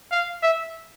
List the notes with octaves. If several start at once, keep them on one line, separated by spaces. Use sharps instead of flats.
F5
E5